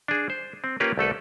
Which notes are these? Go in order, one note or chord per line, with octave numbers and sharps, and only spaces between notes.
D4 G#4
C5
C4
A#3 C#4 F4 G4 A#4 B4
C2 A3 A4 B4